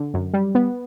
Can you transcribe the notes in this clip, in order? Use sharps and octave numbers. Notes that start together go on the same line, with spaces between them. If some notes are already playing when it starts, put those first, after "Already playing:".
Already playing: D3
F#2
G3
B3